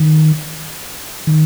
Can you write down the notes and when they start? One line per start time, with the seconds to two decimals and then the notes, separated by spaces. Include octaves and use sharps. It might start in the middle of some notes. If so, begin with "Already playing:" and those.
Already playing: D#3
1.27 D#3